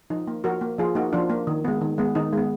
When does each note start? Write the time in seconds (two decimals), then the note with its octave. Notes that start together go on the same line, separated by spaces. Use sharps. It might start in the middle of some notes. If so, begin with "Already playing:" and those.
0.10 F3 D#4
0.27 A#3
0.44 F3 F#4 A#4
0.61 A#3
0.78 F3 F4 G#4
0.95 A#3 D#4 F#4
1.13 F3 D4 F4
1.30 A#3
1.47 D#3
1.64 G#3 B3
1.81 D#3
1.98 G#3 B3
2.15 D#3 D#4
2.33 G#3 B3